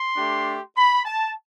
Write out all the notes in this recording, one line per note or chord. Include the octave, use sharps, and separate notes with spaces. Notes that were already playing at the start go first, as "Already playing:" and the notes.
Already playing: C6
A3 D4 G4
B5
A5